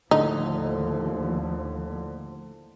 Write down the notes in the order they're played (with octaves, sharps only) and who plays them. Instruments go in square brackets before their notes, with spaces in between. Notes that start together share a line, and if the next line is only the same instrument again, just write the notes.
[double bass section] D#2 F3 [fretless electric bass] A2 [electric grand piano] D3 [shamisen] D#4